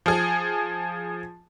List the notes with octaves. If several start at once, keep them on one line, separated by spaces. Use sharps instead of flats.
F3 G#4